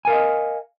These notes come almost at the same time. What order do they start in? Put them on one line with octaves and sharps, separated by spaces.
G#5 A#4 F5 D#5